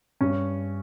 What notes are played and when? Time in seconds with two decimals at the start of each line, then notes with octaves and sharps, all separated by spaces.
0.21 G2 C#4